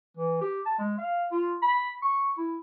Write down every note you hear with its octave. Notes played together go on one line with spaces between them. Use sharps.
E3
G4
A5
G#3
F5
F4
B5
C#6
E4